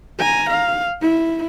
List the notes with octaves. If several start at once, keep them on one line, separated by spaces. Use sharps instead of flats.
G#5 A#5
F5
E4